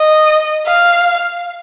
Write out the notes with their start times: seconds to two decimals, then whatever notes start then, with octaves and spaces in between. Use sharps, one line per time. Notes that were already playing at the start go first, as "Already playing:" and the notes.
Already playing: D#5
0.67 F5